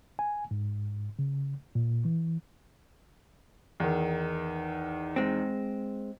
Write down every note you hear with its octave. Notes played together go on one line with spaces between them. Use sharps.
G#5
G#2
C#3
A#2
E3
E2 D#3
G#3 C4